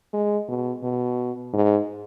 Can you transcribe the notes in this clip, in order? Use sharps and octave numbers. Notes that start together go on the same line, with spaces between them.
G#3
B2
B2
G#2